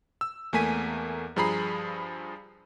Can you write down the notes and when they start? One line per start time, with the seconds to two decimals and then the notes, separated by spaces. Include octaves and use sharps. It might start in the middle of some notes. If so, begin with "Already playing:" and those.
0.21 E6
0.53 E2 A3 A#3 G#5 B6 D#7
1.36 G2 F3 G#4 A#5 B5 C7